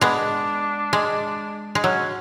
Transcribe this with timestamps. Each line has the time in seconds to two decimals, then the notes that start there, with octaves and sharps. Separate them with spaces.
0.01 G#3 B3 D4
0.93 G#3
1.75 G#3
1.84 F#3 C#4